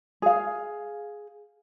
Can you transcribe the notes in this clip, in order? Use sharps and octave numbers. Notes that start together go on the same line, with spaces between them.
G#4 F5